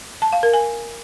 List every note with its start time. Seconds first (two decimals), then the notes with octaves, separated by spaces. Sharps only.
0.22 A5
0.32 F5
0.43 A#4
0.54 G#5